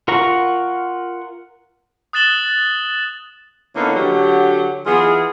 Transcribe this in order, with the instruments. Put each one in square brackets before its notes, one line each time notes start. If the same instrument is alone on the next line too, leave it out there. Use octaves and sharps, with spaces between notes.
[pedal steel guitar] F4 A#4 F#5 A#5 C#6
[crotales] D#6 F#6 A6 E7 F#7 G7
[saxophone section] D3 A#3 B3 C#4 D#4 E4
D3 F#3 G4
E3 B3 F4 G#4